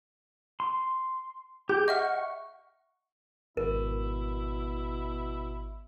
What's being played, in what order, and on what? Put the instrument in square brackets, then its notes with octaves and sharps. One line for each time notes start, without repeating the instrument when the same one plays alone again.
[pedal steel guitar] C6
[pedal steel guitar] G4 [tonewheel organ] G#4 G5 G6
[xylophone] D#5 E5 F6 [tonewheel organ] F#5 [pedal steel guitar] C#6
[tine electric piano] G#1 [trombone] B2 [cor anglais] E4 [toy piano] A#4